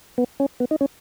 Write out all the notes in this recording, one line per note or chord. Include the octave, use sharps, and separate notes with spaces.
B3
C#4
B3
D#4
C#4